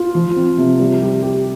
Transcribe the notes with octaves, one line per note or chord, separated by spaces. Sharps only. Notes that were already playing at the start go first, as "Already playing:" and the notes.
Already playing: F4
F3
C4
C3
G3
G4
G4